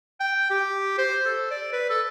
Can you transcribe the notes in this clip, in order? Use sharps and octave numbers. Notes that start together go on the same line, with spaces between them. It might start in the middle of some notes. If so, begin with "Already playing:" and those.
G5
G4
C5
A4
D5
B4
A4